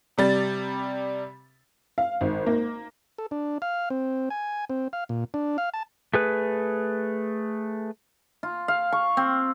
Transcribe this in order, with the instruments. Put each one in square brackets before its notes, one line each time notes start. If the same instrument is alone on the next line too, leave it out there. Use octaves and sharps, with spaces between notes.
[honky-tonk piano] C3 G3 A6
F5
G#1
A#3
[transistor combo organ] A4
D4
F5
C4
G#5
C4
F5
A#2
D4
F5
A5
[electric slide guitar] A3 G#4 B4
[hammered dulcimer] F4
F5
C#6
C4